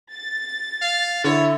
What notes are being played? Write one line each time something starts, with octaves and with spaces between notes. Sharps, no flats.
A6
F5
D3 E4 C#5